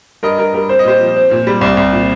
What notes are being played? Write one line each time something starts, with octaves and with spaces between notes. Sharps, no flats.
G2 A#4 D#5
G2 A#4
G3 A#4
C4 C5
D#5
A#2 G4 C5
F3
C4
A#2
G3
C2
C2
A#2